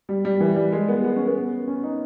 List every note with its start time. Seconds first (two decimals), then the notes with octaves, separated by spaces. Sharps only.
0.09 G3
0.25 G3
0.40 E3
0.56 G3
0.72 G#3
0.88 B3
1.04 B3
1.16 C#4
1.27 B3
1.68 C#4
1.84 D#4